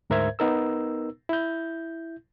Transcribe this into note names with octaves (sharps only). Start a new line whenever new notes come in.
D2 G#2 A#4 C5 E5 G#6
B3 D#4 A#4 E6
E4 G6